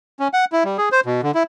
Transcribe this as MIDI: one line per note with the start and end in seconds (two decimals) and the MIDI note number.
0.20 0.28 61
0.33 0.45 78
0.52 0.63 64
0.65 0.77 55
0.78 0.89 68
0.92 1.00 72
1.06 1.21 47
1.23 1.31 50
1.34 1.43 64